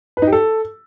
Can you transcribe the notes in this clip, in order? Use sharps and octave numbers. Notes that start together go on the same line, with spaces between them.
B4
D#4
G4
A4